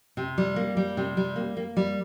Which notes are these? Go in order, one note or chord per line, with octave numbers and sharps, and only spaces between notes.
C3
G3
A#3
G3
C3
G3
A#3
A#3
G3